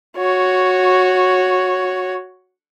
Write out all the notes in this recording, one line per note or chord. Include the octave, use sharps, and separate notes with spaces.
F#4 C#5